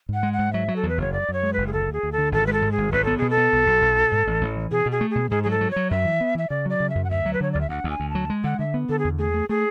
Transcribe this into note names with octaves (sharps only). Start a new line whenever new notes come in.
G#2
F#5
G#3
F#5
G#2
F#3 E5
F#3
A4
E2
B4
F#1 C#5
F#2 D5
F#2 C#5
G#3
F#1 B4
G#4
D2 A4
D2
G#4
D2
A4
D3
G#1 A4
G#3 B4
A4
G#2
G#4
G#1
B1 B4
B3 A4
B2 G#4
A4
B3
B1
B1
B1
B2
G#2
A1
A1
E3
B2 G#4
B2
G#4
A3
B2 G#4
G#2 G#4
G#4
F#3 A4
F#3
C#5
F#3
F#2 E5
E3
B3
E3 E5
C#3 D5
F#3 D5
C#3
E5
F#2
F#5
D2 E5
F#3
B4
D3 C#5
D2 D5
E5
D2 F#5
D2
G#5
D2
A5
F#3
G#3
D3 F#5
D3 E5
B3
D3 A4
G#4
E2
A3 G#4
A3
A3 G#4